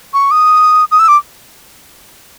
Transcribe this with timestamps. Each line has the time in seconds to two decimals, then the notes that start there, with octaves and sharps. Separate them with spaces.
0.14 C#6
0.31 D#6
0.91 D#6
0.99 E6
1.08 D6